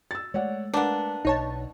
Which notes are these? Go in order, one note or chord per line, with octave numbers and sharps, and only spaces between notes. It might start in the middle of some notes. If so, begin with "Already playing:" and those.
E6 A6
G#3 A3 C#5 D5 F#5
A#3 D4 B4 F#5
B1 D#4 C#5 A5